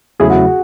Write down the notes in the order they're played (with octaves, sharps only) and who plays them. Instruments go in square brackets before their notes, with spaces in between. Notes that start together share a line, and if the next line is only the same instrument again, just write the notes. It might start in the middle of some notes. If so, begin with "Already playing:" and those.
[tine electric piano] E2 C#3 F#3 A3 E4 [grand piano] G#4
[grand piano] F#4